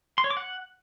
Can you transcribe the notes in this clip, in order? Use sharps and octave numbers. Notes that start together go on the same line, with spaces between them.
C6
C#5
D6
F#5